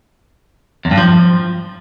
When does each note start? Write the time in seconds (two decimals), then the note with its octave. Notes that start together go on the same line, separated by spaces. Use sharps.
0.85 E2
0.91 G2
0.98 F3